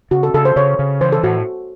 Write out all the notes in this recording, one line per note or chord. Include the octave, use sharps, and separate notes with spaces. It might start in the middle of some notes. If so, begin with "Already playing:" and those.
C#3 F#4
A4
C#3 A4
C5
C#3 C#5
C#3
E3 C5
A4
A2 F#4